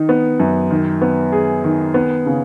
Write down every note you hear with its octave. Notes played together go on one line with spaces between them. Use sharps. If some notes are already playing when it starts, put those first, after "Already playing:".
Already playing: D#3 D#4
B3
F#2
D#3
B3
G#4
D#3
B3
C#3